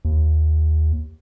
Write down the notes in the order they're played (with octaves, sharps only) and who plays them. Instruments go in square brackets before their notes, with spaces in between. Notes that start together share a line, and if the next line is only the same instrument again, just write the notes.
[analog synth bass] D#2